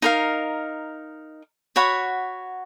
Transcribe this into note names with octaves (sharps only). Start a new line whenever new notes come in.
D#4 A#4 F5
F#4 C#5 F#5 B5